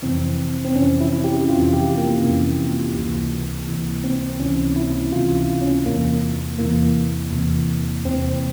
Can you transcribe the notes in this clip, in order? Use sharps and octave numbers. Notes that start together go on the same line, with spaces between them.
F2 C3 E3 C4
C4
F2 C3 E3 C#4
E4
G4
F2 C3 E3 F4
G4
A#3
F2 C3 E3
C#2 C3 E3
C#2 C3 E3
C4
C#2 C3 E3 C#4
E4
C#2 C3 E3 F4
C#4
E2 C3 E3 A#3
E2 C3 E3 A#3
E2 C3 E3
E2 C3 E3 C4